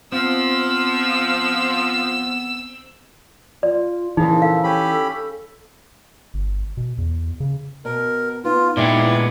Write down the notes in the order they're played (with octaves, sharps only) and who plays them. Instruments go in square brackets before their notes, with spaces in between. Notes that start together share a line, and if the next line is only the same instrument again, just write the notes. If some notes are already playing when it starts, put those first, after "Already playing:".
[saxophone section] F3 [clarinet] B3 [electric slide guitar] C4 [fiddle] E6
[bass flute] F4 [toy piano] D5
[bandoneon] A#2 C#3 F3 [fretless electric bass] E3 [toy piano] D#4 [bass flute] G#4
[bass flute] A4 [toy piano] F5
[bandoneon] C#4 G4 B5
[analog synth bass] G1
B2
E2
C#3
[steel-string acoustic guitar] B2 [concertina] A#4
[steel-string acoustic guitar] B3 [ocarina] D#4 [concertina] F4
[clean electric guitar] A#2 G#3 B3 [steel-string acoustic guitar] E4 E5 G5 [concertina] D5